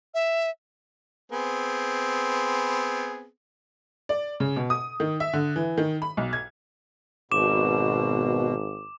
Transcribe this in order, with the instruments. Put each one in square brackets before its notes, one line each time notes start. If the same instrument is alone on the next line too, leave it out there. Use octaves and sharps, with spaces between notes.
[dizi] E5
[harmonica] B3 C4 G#4
[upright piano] D5
C#3
B2
D#6
D#3
E5
D3
E3
D#3
B5
B1
G#6
[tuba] G#1 [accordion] B2 [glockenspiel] D6 E7